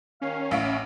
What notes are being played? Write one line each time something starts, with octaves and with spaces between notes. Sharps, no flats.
D#2 D#3 C#4 F5
A1 E5 F5 D7